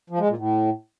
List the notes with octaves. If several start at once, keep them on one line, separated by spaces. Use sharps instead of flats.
F3
G#3
A#2
A2